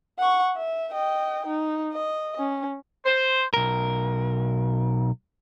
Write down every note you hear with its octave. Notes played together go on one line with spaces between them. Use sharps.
F#5 C#6
E5
D#5 G5
D#4
D#5
C#4
C5
B1 A#4